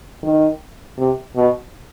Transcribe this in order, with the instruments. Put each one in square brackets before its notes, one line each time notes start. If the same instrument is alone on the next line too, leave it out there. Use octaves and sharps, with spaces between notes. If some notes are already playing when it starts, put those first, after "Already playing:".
[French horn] D#3
C3
B2